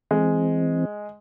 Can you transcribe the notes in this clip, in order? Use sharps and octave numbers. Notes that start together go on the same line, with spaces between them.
E3 G#3 C4